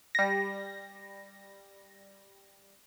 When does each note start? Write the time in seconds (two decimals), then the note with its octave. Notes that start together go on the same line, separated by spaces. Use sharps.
0.15 G3 A#6